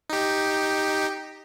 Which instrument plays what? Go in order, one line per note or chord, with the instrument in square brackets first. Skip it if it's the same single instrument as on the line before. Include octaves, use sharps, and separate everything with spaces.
[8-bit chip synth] D#4 G4